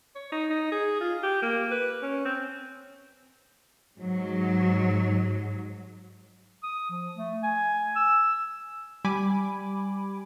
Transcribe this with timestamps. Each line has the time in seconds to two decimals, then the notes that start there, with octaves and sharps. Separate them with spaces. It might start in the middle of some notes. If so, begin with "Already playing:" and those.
0.15 C#5
0.32 D#4
0.50 D#4
0.72 G#4
1.01 F4
1.23 G4
1.42 A#3
1.71 B4
2.02 C#4
2.25 C4
3.99 G#2 F#3
6.63 D#6
6.90 F3
7.17 A3
7.43 G#5
7.96 E6
9.05 G3 G#5 B5 D6